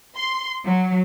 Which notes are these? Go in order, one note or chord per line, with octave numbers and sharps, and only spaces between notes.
C6
F#3